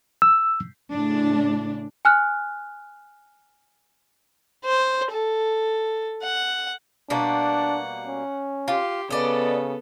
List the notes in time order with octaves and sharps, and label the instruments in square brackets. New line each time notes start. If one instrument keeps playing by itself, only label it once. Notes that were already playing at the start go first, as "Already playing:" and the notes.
[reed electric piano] E6
[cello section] A2 C#3 D4
[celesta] G#5 F6 F#6
[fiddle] C5
A4
F#5
[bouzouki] B2 G3 A#3 [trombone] D4 [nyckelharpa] F#5
[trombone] C#4
[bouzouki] F4 [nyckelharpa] G4 C6
[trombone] C#3 [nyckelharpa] B3 A4 [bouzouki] D5 D#5